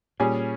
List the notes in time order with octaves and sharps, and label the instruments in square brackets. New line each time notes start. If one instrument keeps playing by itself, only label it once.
[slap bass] A#2 [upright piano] G3 C#4 G#4